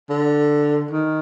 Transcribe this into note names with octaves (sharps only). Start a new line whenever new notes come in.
D3
D#3